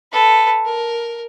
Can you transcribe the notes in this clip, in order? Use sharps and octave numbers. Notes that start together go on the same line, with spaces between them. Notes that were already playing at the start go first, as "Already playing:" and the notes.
A4 B4
A#4